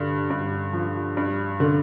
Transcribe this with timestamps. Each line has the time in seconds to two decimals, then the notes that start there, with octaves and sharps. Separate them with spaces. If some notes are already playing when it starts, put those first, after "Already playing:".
Already playing: G2 D3
0.30 G2
0.73 F3
1.17 G2
1.60 D3